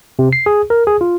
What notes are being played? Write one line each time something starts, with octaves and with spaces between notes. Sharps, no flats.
C3
C7
G#4
A#4
G#4
F4